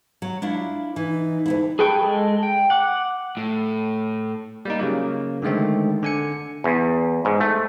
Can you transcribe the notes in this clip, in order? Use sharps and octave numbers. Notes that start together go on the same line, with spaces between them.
F#3
D4 E4 F4
E3 D#4
D2 G2 E4
G#4 A4 B4 G5 C#6
G#3 A4
G5
F#5 D6
A2
G3 A#3 D#4
C#3 F#3 A#3
D3 D#3 G#3 A3 C4
D3 G#5 C#7
E2
G#2
A3